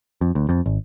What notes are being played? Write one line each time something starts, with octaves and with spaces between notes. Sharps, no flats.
F2
D2
F2
G#1